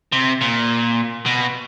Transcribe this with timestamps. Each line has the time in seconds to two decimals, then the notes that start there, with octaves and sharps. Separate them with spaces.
0.12 C3
0.41 A#2
1.26 B2